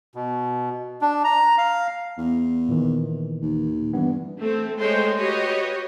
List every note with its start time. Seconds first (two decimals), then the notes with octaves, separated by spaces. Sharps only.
0.15 B2
1.01 D4
1.24 A#5
1.58 F5
2.17 E2
2.69 A#2 D#3 E3
3.42 D#2
3.93 G2 E3 B3
4.40 A3 C4
4.79 G#3 A3 C5 C#5 G5 C6
5.17 F#4 G4 B4 C#5 D#5